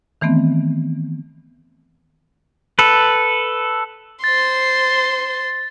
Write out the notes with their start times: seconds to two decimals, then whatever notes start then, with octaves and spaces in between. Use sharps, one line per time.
0.21 D#3 E3 A3 B3 C4
2.79 A4 B4
4.24 C5 C6 A6